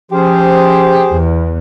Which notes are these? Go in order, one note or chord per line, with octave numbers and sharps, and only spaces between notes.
F3 C#4 G4 G#4 C5
E2